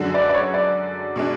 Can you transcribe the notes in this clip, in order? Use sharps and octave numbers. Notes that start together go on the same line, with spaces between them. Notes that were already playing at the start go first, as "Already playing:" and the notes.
Already playing: F#2 D3 G#3 D4 F#4
D5
D5
C#5
D5
B2 G#3 D4